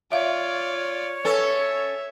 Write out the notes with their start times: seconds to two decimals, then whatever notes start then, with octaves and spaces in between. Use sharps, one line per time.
0.12 F4 C#5 D5 E5 F5
1.25 C#4 A4 B4 E5